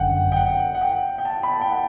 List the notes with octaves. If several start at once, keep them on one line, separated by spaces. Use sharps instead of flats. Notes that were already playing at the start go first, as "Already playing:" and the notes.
Already playing: G1 F#2 D3 F#5 G5
G5
F#5
F#5
G5
G5
A5
B5
A5
G5
F#5